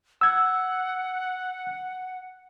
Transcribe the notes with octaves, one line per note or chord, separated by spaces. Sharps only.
F#5 E6 G#6